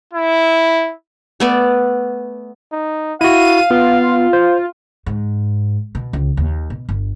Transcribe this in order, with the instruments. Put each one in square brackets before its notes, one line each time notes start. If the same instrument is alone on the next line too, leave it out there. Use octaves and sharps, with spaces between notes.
[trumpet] E4
[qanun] A3 B3 D5
[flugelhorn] D#4
[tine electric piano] E4 F#4 [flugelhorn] F5 [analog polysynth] D#7
[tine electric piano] B3 [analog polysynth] F4
[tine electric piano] C5
[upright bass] G#2
B2
C#2
D#2
B2
G1